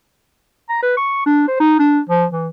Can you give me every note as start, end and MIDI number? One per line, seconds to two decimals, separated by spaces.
0.69 0.79 82
0.83 0.96 71
0.97 1.21 85
1.26 1.48 62
1.48 1.58 72
1.60 1.77 63
1.79 2.00 62
2.09 2.25 53
2.33 2.48 52